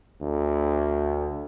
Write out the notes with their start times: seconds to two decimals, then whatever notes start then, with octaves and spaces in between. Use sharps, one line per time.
0.21 D2